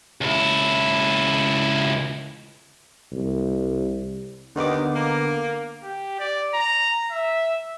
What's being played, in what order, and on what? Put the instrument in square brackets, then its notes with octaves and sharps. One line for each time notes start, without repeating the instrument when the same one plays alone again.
[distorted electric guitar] C#2 E4
[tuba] C2
[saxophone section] D#2 D#3 [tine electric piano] D3 B3 D6
[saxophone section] A#3
[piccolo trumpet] G4
D5
A#5
E5